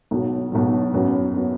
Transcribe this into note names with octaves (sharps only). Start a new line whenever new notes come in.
B1 B2 F#3
B1 B2 F#3
F#2 F#3 B3
F#3 B3